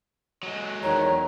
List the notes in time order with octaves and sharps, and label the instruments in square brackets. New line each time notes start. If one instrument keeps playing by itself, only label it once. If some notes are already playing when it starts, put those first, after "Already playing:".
[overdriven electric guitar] F#3 G#3
[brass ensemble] E2 D#3 [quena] C#5 [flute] A#5